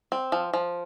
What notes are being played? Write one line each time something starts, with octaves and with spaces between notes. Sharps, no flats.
C4
F3
F3